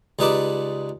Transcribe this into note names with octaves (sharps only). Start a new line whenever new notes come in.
C#2 G3 D#4 B4 A5 D6